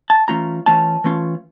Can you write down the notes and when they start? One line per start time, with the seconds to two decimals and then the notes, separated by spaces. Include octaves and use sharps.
0.10 A5
0.28 E3 A3 C#4 F4 A#5
0.66 E3 A3 C#4 F4 A5
1.04 E3 A3 C#4 F4